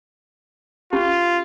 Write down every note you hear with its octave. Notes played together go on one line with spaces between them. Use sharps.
C#4 F4 G4 B5